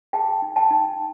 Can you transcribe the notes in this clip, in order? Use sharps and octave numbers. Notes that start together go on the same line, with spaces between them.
G#4 G5 A5
D#4
G5 A5
D#4